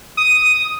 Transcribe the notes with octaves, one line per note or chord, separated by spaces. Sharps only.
D#6